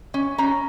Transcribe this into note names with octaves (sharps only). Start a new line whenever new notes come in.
C#4
C#4 A#5